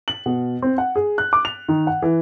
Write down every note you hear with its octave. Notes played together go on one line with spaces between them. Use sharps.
F#7
B2
C4
F#5
G#4
F#6
D6
F7
D#3
F#5
E3